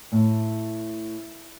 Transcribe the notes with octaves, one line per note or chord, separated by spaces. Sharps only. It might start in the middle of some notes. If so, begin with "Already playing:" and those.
A2